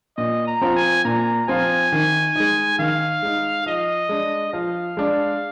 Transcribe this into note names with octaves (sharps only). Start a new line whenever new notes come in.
A#2 D#5
A#5
F3 C4 F4
G#5
A#2 A#5
F3 C4 F4 G#5
D#3
G#3 D#4
D#3 F5
G#3 D#4
F3 D#5
G#3 D4
F3 F5
G#3 D4